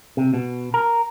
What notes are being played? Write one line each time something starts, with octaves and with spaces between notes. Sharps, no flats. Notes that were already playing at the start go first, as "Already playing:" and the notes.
C3
B2
A#4